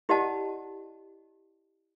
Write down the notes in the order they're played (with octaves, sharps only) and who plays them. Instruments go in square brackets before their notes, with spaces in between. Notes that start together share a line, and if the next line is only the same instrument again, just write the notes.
[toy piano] E4 G4 D5 D#5 F#5 A5